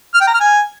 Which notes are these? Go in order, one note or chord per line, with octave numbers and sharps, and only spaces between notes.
F6
G5
A#5
F6
G#5